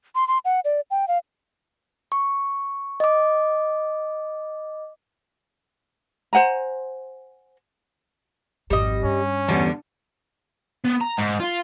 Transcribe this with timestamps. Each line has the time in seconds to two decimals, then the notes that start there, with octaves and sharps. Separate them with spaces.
0.15 C6
0.28 C6
0.45 F#5
0.65 D5
0.91 G5
1.08 F5
2.12 C#6
3.00 D#5 D6
6.33 C5 F#5 G#5 A#5
8.70 G#1 F2 G3 D#5
9.04 G2 C#4
9.48 E2 D3 G3 B3
10.84 B3
11.01 A#5
11.18 G#2
11.40 F4